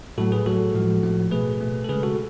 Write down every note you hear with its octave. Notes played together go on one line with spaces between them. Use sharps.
A2 F#3 A3 F#4 A4
G#4 B4
A2 F#3 A3 F#4 A4
A2 F3 G#3
A2 F3 A3
B2 A3 G#4 B4
B2 A3
A4
C#3 G#3 G#4 B4
F#4 A4